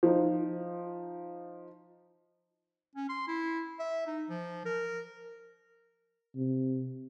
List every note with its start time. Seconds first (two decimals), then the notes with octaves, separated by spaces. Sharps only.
0.03 F3 D#4
2.96 C#4
3.09 C6
3.27 E4
3.79 E5
4.07 D#4
4.29 F3
4.65 A#4
6.36 C3